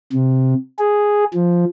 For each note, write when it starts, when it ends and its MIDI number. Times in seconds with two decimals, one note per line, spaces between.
0.13 0.54 48
0.79 1.24 68
1.34 1.65 53